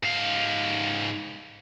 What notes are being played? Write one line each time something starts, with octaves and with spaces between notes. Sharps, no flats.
G#2 F5